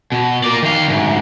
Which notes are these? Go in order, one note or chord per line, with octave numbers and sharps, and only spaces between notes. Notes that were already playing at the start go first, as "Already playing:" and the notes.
B2
A#3 D5
D#3 F5
D2 G#2